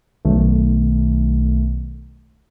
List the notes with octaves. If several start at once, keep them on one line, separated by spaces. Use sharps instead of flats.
B1 D#3 A3